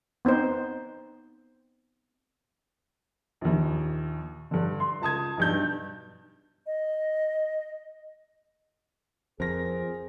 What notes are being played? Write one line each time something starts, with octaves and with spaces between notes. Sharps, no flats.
B3 C4 D#4 C5
A#1 D#2
G2 D3
C6
C#2 A5 D#6 G#6
B1 G2 G6
D#5
F2 G#4 A#4 C5 A#6